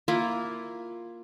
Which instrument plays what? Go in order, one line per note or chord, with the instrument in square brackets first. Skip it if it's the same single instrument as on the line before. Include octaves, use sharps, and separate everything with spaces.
[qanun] A#3 E4 F4